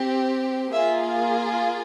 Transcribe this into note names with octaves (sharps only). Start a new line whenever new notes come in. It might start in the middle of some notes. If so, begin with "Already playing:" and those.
Already playing: C4 G4
A#3 F4 G#4 E5